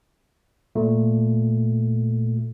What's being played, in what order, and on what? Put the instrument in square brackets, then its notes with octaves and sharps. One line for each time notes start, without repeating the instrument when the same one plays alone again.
[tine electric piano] A#2 A3